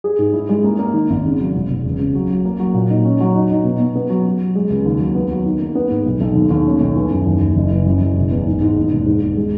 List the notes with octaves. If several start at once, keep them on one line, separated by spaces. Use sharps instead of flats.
G#4
G#2
E4
G#3
A#3
A#3
D#3
G#1
C#3
F#3
E1
E1
C#2
C#3
F#3
F#3
A#3
F#3
A#2
D#4
C#4
F#3
D#4
D#4
B2
B2
B3
F#3
F#3
F#3
G#3
C#2
D#2
F#3
B3
F#3
D#3
A#3
B3
G#2
B1
B1
D#2
D#2
C#4
B1
E3
F#2
D#2
D#2
F#1
E3
F#2
F#1
E1
E2
G#2
G#2
D#2
E1
G#2
G#2
G#3